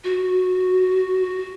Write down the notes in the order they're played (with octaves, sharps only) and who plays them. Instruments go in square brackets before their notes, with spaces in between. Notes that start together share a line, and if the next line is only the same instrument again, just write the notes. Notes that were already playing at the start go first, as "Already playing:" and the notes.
[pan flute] F#4